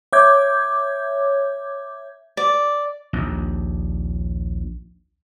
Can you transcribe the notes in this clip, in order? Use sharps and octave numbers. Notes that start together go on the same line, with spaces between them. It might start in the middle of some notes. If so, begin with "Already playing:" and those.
C#5 E5 D6 G6 G#6
D5
A#1 D#2